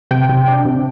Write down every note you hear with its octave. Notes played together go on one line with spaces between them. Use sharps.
C3 G5
C3
D4
C3